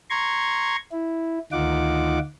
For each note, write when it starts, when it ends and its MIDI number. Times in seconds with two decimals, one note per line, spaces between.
0.10 0.76 82
0.10 0.76 84
0.10 0.76 85
0.10 0.76 92
0.92 1.39 64
1.52 2.19 38
1.52 2.19 51
1.52 2.19 63
1.52 2.19 65
1.52 2.19 78
1.52 2.19 86